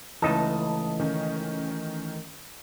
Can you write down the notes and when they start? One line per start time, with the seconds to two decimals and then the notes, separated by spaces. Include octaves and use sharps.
0.22 C#2 E3 A3 D#4 A4 A5 D#6
1.00 D#3 C#4